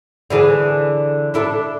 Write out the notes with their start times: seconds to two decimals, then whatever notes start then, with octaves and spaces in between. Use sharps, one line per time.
0.30 D3 E3 G#4
1.34 D4 E4 A4